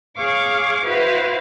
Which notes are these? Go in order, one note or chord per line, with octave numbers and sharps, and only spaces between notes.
G#4 C#5 F5 C#6 D6
E4 F#4 B4 C5 F5